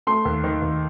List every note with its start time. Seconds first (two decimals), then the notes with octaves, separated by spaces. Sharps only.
0.07 A3 C6
0.25 D#2
0.44 D#3
0.62 D#2